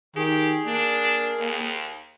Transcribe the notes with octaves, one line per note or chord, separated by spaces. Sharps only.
D#3 G4 G#4
A#3 D4
D#2